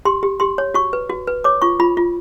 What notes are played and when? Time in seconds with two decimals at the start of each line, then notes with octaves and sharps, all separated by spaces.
0.05 G4 C6
0.23 G4
0.40 G4 C6
0.58 C#5
0.74 F#4 C#6
0.93 B4
1.10 F#4
1.27 B4
1.44 C#5 D6
1.62 F4 C#6
1.80 F4 B5
1.97 F4